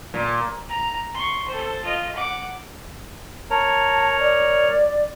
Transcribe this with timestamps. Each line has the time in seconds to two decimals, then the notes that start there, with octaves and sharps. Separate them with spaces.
0.14 A#2
0.69 A#5
1.14 C6 C#6
1.48 A4 C5
1.84 F4 D#5
2.16 F#5 D6
3.50 A#4 C#5 A5 A#5
4.20 D5